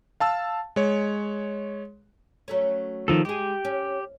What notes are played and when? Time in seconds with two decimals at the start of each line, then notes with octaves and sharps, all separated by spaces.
0.20 F5 A5 E6
0.76 G#3 C#5
2.48 F#3 A3 C#4
3.08 D#3 F3 A4
3.25 G#3 G4 G#4
3.65 C#4